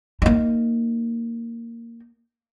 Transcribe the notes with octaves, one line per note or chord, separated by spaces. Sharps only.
A#3 D#4